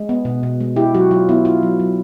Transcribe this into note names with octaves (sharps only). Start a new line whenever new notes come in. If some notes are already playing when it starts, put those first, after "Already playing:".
Already playing: G#3
B3
B2
B2
G#3
E4 G4
F#3 F#4
F#3 F4
B3 E4
E4 F4
F#3
F#3